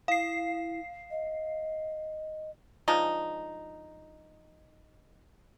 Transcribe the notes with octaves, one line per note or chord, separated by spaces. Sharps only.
E4 F5 C7
D#5
F3 G#3 D4 D#4